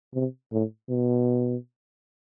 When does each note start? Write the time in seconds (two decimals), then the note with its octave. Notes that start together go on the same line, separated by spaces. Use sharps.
0.15 C3
0.52 A2
0.89 B2